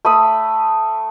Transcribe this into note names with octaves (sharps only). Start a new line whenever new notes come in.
A3 B5 D#6